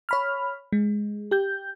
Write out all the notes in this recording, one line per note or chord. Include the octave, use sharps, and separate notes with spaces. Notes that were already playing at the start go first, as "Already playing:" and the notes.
C#5 B5 F6
G#3
G4 G6